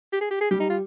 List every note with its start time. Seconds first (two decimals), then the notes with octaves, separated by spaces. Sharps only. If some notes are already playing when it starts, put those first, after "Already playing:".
0.13 G4
0.21 G#4
0.31 G4
0.41 G#4
0.51 G3 G4
0.60 D#4
0.70 F4